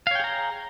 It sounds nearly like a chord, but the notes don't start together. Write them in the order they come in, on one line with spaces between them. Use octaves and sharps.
F5 C#5 G5 G#4 A#5